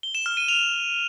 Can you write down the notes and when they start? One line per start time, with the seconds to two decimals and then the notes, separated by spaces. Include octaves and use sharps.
0.03 G7
0.15 E7
0.26 F6
0.37 D#7
0.48 F7